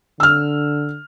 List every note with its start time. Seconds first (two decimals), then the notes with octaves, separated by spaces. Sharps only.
0.20 D3 E6 F6